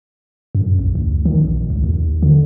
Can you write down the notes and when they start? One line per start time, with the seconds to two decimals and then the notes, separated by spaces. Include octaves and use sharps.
0.55 F#2
0.79 A#1
0.95 D2
1.25 D#3
1.45 A#1
1.70 C#2
1.84 D#2
2.23 D3